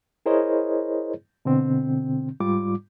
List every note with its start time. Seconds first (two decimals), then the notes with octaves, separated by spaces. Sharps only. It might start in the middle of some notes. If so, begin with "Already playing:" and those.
0.26 E4 G#4 A#4 C5 C#5 D#5
1.45 B2 D3 C4
2.40 G#2 G3 F4 D6